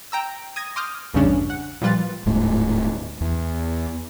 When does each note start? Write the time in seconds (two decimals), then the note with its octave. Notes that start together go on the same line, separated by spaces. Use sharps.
0.12 G5 A#5 E6
0.56 D#6 G#6 A#6
0.76 C6 D6 D#6 F6 G6
1.14 A1 E2 G2 C#3 C#4 D4
1.50 F#5
1.81 A#2 F3 G3 F4 B4 A6
2.26 D1 G#2 A3
3.21 E2